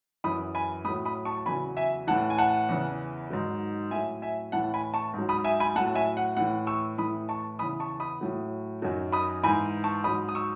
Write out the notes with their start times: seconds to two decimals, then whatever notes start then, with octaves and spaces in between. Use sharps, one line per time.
0.24 F#2 E3 B5 D#6
0.55 G#5 B5
0.84 A2 B5 D#6
0.89 F#3
1.05 B5 D#6
1.25 A5 C#6
1.46 E2 C#3 F#3 G#5 B5
1.77 E5 G#5
2.07 A2 E3 F#5 A5
2.30 G#5
2.38 F#5 A5
2.69 E2 C#3 E3
3.30 G#2 D#3 F#3
3.91 A2 E5 G#5
3.96 F#3
4.22 E5 G#5
4.52 A2 E3 F#5 A5
4.74 G#5 B5
4.94 A5 C#6
5.14 G#2 F#3
5.29 B5 D#6
5.44 E5 G#5
5.60 G#5 B5
5.75 A2 F#3 F#5 A5
5.95 E5 G#5
6.17 F#5
6.37 A2 E3 F#5
6.67 C#6 E6
6.98 A2 E3 B5 D#6
7.29 A5 C#6
7.59 E2 C#3 E3 B5 D#6
7.80 A5 C#6
8.00 B5 D#6
8.21 A2 F#3
8.82 F#2 D#3 F#3
9.12 B5 D#6
9.44 G#2 E3 G#5 B5
9.84 A5 C#6
10.04 G#2 F#3 B5 D#6
10.29 D#6
10.35 C#6 E6